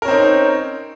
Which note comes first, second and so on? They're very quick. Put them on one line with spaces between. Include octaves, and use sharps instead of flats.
A#4 C#4 C4 D#4